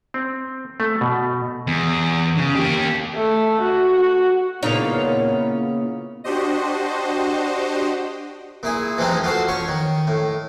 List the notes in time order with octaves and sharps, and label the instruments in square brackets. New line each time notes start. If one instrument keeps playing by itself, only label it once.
[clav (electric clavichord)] C4
A3
B2
[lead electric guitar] E2
C#3
A#3 G4
[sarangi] A3
F#4
F#4
[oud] A#2 C#3 D#4 [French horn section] B3 E4 [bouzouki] C#5 F5
[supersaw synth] D4 F#4 G4 C5 D#5
[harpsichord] A#2 E4 G#4
E3 F3 G3 G#3 C4 D#4
F4 F#4 A4 C5
C#4 C#5 C#6
D#3
A2